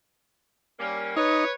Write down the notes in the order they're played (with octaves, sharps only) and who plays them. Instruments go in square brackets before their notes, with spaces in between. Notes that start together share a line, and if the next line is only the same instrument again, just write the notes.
[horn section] G3 A#3 C#4
[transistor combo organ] D#4 [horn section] B4 C#5